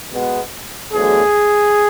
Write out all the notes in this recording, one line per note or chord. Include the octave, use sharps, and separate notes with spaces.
B2 G#3 B3
E2 D3 F#3 A3 G#4